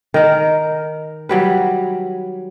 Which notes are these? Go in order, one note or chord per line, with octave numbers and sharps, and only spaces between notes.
D#3 A#4
F#3 G3 B4